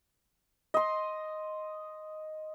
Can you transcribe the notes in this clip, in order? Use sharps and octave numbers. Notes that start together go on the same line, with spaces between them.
D#5 C6